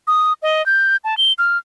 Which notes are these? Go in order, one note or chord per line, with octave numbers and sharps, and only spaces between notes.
D#6
D#5
G6
A5
G7
F6